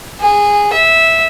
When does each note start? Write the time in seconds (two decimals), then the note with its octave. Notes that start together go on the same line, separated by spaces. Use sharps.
0.21 G#4
0.73 E5